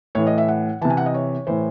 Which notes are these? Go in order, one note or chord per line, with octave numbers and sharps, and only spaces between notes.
A2 E3 C#5
D#5
E5
F#5
C3 E3 A5
G#5
F#5
D#5
C#5
A2 E3 C5